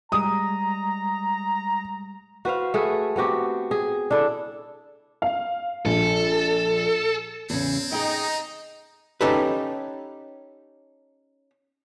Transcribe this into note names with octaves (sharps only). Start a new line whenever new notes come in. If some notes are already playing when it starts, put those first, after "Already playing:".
G3 G#3 A#5 D#6
F#4 B4 C5 F5
A3 G#4 B4
B3 C4 F#4 G4
G#4
D4 E4 A4
F5
A#1 A4
E2 C#3 C4
D#4 G#4 G5
C#4 D#4 G4 A4 B4